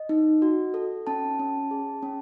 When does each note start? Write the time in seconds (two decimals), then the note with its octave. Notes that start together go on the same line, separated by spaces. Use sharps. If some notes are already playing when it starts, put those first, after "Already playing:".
Already playing: D#5
0.09 D#4
0.42 F#4
0.74 A4
1.07 C#4 A5
1.39 C#4
1.71 G#4
2.03 C#4